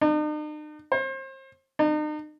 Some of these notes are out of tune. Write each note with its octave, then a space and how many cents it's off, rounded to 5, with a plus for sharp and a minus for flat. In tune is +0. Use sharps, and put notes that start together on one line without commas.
D#4 -45
C5 +35
D#4 -40